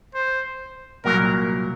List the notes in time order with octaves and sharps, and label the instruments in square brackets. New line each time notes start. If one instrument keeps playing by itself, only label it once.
[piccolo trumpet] C5
[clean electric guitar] C2 A#2 F#3 A#3 [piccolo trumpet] A#4